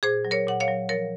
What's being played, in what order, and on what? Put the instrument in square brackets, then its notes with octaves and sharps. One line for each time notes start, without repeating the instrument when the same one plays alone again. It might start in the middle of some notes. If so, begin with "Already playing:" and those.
[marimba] A#2 G#4 C5
F#3
A#4 C#5
A#2 F#5
C#5 F5
F#3
F3 A#4 C#5